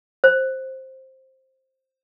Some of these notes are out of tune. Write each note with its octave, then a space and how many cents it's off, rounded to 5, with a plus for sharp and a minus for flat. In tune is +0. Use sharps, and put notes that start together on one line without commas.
C5 +10